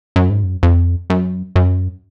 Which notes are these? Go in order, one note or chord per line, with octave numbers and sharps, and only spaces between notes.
F#2
G#2
F#2
F2
F#2
F#2